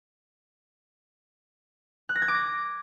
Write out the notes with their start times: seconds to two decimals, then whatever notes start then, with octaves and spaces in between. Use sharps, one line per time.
2.09 F#6
2.16 A#6
2.22 G#6
2.28 D6
2.35 A#6